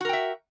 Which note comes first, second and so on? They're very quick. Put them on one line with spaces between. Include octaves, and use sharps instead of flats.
F#4 A#4 G5 E5